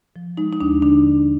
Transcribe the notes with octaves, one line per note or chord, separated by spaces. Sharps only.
F3
G#3 D#4
D#4
D#2 D4
D3 D4